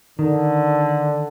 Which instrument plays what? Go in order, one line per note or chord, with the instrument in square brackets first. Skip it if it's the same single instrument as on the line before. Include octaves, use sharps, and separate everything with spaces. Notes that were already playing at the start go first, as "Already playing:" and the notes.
[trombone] D3 [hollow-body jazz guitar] D#3